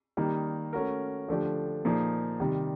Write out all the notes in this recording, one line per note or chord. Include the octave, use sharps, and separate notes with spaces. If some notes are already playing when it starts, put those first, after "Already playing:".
D#3 G3 A#3 D#4
A3 C#4 F#4 A#4
D3 F3 A3 D4 G4
A#2 F3 A#3 D#4 G#4
C3 D#3 G3